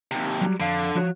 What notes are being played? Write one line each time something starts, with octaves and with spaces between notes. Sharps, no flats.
D#2 C3
F#3 G3
F2 D3 F5
F3 F#4 C#5